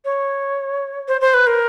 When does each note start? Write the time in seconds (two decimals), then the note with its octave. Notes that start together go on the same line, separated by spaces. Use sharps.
0.05 C#5
1.08 C5
1.21 C5
1.34 B4
1.47 A#4